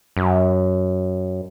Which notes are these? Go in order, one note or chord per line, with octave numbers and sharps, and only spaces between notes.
F#2